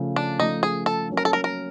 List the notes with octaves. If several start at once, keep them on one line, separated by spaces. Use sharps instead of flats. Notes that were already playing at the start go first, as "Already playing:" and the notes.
Already playing: C#3 F3 A3
D4
C#3 F3 A3 D#4
G#4
A4
F#3 A#3 C#4
A#4
A4
A#4
A#4